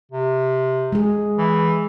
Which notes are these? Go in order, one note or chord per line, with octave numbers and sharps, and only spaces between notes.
C3
G#3 G#4
E3